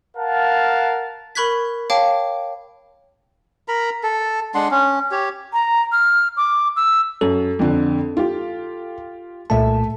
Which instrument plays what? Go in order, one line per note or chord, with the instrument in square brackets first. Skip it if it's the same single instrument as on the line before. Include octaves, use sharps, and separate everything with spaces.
[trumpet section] A#4 F5 F#5 A5
[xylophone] A#4 B5 C#6 F#6 G#6 B6
C#5 F5 G5 A5 D6
[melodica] A#4 A#5 B5
A4
G#3 D4 F#5 C6
C#4
G4 C#5
[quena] A#5
F6
D6
E6
[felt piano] F#2 [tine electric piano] A4
[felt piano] F2 D3
F4 G4
[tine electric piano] C2 A#2 A5 [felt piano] A3 E5